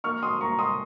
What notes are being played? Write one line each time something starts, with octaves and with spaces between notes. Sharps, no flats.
A#3 C#6 F6
C6 D#6
A#3 A#5 C#6
C6 D#6